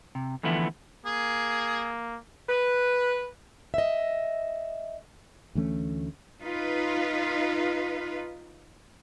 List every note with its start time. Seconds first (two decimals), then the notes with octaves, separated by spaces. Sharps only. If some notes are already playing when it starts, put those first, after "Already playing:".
0.15 C3
0.43 D3 E3 F3 A3 B3 E4
1.06 A#3 G#4
2.47 B4
3.74 D#5 E5
5.55 D2 E3 A3 C#4
6.41 D#4 F4 B4 F5